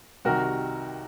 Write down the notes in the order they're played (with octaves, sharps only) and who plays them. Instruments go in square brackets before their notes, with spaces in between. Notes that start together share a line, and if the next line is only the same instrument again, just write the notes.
[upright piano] C2 C3 D#3 F#4 A#4